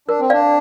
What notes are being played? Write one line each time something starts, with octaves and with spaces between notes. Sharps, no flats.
D4 A#4
C4
D4 D5 F5